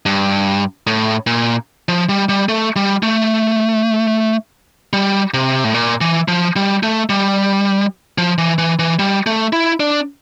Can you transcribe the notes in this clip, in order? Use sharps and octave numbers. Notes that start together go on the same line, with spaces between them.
G2
A2
A#2
F3
G3
G3
A3
G3
A3
G3
C3
A2
A#2
E3
F3
G3
A3
G3
F3
E3
E3
E3
G3
A3
E4
D4